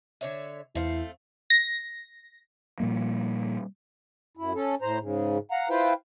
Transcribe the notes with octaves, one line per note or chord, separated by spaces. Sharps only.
D3 C#5 E5
E2 A3 C4 E4 F5
A#6
A#2 F3 G3 A#3
F#2 E4
C#4 A4
A2 C5 A#5
G#2 C#3
F5 F#5 A#5
E4 F4 B4 C5 F5 G5